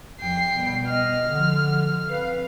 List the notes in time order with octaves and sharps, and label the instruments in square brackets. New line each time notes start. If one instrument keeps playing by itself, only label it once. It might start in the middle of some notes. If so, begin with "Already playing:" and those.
[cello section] F2 [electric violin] G5 C7
[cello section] B2 [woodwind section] G3
[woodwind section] D#5 [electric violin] F6
[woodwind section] D3 [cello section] F3
[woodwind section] C4 B4 [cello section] F5